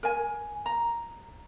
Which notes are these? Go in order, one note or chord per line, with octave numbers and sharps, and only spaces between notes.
A#4 G#5
A#5